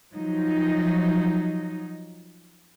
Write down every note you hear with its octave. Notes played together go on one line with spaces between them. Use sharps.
F3 F#3 D#4